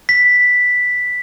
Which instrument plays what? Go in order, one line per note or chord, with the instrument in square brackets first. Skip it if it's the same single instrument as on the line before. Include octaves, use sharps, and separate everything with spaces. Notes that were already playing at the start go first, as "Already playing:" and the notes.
[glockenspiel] B6